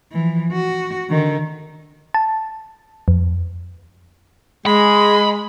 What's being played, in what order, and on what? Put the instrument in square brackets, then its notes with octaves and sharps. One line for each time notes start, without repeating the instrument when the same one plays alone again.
[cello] E3 F3
F#4
D3 D#3
[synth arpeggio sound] A5
F2
[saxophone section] G#3 [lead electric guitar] B5